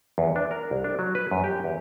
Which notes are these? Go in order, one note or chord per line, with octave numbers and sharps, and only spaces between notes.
E2
D4
A#4
C2
D4
F#3
B4
F#2
G4
E2